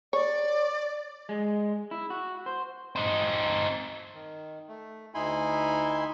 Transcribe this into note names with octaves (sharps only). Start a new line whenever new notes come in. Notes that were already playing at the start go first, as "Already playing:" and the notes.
C#5 D5
G#3
E4
F#4
C5
C4 D#4
D#3
A3
D2 D#4 E4 G#5 B5 C6